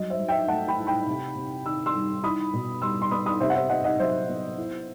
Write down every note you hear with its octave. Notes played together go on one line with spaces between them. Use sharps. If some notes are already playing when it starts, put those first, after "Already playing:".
Already playing: F#3 G3 D#5
C5 E5
F#3
E5 G5
A3 F#5 A5
G5 B5
E4
G5 B5
C3
C3
D#3 E6
C6 E6
G3
E4 B5 D#6
B2
G3 C6 E6
C6
B3 B5 D#6
B5 D#6
C3 C5 E5
F#5
C5 E5
C3 D#5 F#5
D#5 F#5
F#3 C5 E5
B3
E4